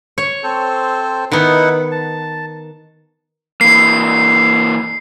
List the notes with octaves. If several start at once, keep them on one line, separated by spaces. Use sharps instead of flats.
C#5
C4 A4 C5
D#3 B3 D#4 E4 F#5
A5
E3 A#3 C7